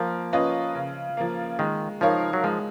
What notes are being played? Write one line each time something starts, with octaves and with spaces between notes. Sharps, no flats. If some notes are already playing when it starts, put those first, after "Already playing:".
Already playing: F3 A#3
C#4 F4 B4 D#5
C#3
F3 A#3
D#3 G#3
F3 D#4 A#4 C#5 F5
F#3
F3 G#3